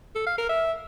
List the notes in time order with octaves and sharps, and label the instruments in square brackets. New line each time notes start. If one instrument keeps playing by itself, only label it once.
[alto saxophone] A4
F5
A#4
E5